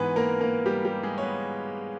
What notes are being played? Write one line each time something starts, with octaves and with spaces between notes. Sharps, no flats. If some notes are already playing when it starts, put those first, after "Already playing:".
Already playing: G#2 E3 B3 B4
A#3 A#4
A#3 A#4
G3 G4
G3 G4
G#3 G#4
C#5
B3 B4